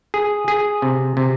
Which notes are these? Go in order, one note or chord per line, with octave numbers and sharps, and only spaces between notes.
G#4
G#4
C3
C3